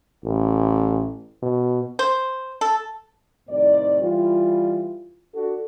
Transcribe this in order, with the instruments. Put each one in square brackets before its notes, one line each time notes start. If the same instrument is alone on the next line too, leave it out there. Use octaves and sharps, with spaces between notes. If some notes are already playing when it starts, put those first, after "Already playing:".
[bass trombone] A1
B2
[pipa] C5
A4
[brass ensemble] C2 A2 D#3 C4 D5
E3 G3 F4
D4 F#4 A4